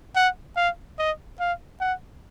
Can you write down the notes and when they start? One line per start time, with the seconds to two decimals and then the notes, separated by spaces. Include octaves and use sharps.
0.16 F#5
0.56 F5
0.99 D#5
1.40 F5
1.80 F#5